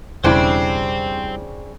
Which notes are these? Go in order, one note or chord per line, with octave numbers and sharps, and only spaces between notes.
E1 C#3 G3 C4 D4 E4 C5 G5